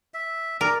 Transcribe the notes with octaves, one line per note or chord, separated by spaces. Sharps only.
E5
A#4 D5